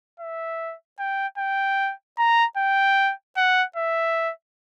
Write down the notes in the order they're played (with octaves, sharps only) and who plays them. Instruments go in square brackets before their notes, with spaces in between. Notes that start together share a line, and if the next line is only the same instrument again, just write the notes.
[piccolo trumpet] E5
G5
G5
A#5
G5
F#5
E5